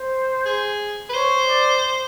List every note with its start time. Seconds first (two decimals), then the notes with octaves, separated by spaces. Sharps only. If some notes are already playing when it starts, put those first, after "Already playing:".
Already playing: C5
0.46 G#4
1.10 B4
1.14 C5 C#5
1.49 D5